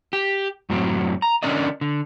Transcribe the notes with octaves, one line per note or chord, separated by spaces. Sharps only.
G4
F#2 A2 F#3 C4
A#5
D3 C#4 D4 A#4 D5 D#5
D3